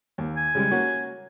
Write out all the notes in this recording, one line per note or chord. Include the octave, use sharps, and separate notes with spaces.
D#2
G#5
C#3 G3 G#3
A#3 C#4 F#4